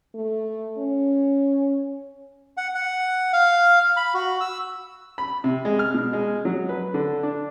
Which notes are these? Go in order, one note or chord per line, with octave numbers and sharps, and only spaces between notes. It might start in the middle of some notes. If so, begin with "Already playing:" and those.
A3
C#4
F#5
F#5
F5
B5
F#4
E6
B5
C3
G#3
F6
B2
G#3
F#3
B4
D3
D4